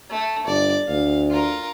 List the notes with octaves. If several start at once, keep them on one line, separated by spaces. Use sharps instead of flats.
A3
G1 D5
D2 F5
F4 A#4